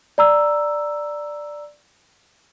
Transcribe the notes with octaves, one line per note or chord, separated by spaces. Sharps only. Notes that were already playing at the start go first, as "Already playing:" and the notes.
D5 A#5 E6